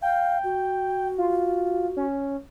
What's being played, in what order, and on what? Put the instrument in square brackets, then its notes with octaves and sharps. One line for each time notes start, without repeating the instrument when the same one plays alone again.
[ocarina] F5 [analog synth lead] G5
[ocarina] F#4
[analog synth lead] F4
C#4